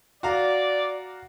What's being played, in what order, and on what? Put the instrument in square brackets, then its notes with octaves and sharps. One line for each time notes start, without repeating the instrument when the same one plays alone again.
[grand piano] F#4 F5 A#5 [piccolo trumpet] D5